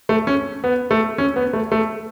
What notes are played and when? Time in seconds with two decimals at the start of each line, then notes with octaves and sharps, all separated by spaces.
0.09 A3
0.27 C#4
0.64 B3
0.91 A3
1.18 C#4
1.36 B3
1.53 A3
1.72 A3